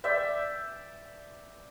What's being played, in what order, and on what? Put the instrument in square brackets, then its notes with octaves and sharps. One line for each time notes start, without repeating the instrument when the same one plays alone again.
[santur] D5 E5 G5